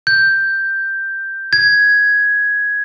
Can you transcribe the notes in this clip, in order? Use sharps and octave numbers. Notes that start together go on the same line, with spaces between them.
G6
G#6